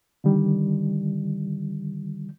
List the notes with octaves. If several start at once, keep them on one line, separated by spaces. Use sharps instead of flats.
D3 D#3 G3